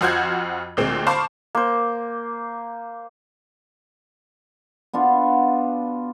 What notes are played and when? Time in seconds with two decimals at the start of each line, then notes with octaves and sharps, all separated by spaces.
0.01 F2 F4 F#4 C5 G6 G#6
0.77 D2 A#2 G#3 C4
1.07 C5 F5 A5 B5 C#6 D6
1.55 A#3 C5
4.93 B3 D4 F4 F#4